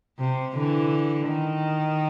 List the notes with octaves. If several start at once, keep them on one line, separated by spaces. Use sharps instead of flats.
C3
D3 E3
D#3